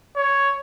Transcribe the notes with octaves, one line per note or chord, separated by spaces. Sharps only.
C#5